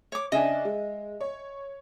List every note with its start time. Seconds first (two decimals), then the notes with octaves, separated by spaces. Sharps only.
0.12 C#5 D6
0.32 C#3 D4 D#5 E5 G#5
0.65 G#3
1.20 C#5